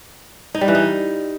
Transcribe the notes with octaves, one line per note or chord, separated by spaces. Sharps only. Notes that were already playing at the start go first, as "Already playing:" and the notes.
D#4
G3
E3
D#4